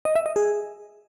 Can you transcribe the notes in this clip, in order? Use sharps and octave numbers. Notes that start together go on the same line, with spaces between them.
D#5
E5
D#5
G#4